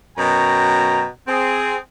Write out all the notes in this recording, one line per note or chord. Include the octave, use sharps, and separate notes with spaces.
F#2 B2 G5 A#5
C4 G#4